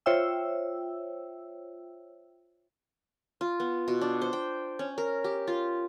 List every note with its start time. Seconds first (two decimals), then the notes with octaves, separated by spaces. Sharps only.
0.06 F4 C5 C#5 E5 G5 E6
3.41 F4
3.60 B3
3.88 B2
4.01 D4
4.22 C5
4.33 G5
4.79 C#4
4.98 A#4
5.24 G4
5.47 F4